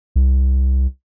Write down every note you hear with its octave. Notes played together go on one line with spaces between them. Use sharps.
C2